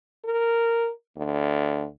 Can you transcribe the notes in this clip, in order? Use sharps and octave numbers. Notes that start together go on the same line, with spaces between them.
A#4
D2